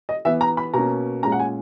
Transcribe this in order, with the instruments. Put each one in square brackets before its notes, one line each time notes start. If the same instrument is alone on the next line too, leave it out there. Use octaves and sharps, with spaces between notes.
[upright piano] D#5
E3 B3 E5
A#5
B5
B2 A#3 C#4 A#5
A#2 G#3 C#4 A#5
F#5
G#5